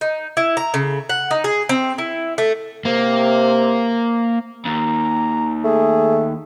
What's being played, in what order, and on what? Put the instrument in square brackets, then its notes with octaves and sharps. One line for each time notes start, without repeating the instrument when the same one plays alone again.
[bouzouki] D#4
E4
A#5
C#3
F#5
D#4
G#4
C4
E4
A3
[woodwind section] C3 [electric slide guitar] A#3
[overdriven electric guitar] D#2 [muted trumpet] A#5
[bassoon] A3 [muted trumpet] G#4